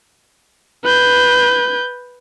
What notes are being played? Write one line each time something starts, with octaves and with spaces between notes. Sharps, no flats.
B4 G6